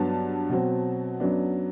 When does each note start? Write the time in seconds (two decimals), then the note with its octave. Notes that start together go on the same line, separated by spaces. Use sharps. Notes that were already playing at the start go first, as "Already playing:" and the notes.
Already playing: G2 F#3 B3 A5
0.50 B2 F#3 C4
1.20 F#2 F#3 B3 D4